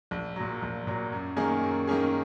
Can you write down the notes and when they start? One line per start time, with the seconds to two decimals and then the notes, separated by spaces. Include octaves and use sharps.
0.11 A#1
0.36 A#2 F#3
0.62 A#1
0.87 A#2 F#3
1.12 F#2
1.36 D#3 A#3 C#4 G#4
1.63 F#2
1.87 D#3 A#3 C#4 G#4